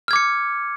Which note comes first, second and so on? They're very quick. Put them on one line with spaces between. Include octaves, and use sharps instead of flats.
F6 G#6 D6 C#7